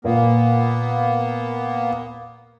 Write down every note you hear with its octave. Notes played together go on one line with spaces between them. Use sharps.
A#2 A#3 B3